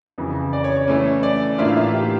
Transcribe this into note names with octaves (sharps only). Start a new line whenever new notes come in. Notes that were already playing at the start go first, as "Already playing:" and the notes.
F2 C#3 E3
D5
C#5
C#5
E3 A3 C#4
D5
A2 E3 A#3 D4 F4 E5
F5
E5
G4